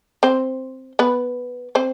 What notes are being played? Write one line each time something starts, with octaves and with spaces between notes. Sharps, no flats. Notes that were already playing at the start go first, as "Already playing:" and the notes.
C4 C5
B3 B4
C4 C5